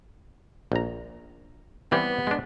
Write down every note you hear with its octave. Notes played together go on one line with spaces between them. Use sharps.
A#1 A#5
E3 G3 B3 C4
G#3 D4